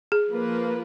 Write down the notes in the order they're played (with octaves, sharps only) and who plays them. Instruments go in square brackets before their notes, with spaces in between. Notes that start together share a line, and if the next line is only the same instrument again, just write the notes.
[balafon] G#4
[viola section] F3 A#3 F4 B4